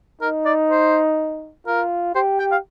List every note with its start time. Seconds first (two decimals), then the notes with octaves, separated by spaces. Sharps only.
0.21 D#4 A#4
0.45 D5
0.70 C5
1.67 F4 A#4
2.15 G4 C5
2.39 G5
2.52 F5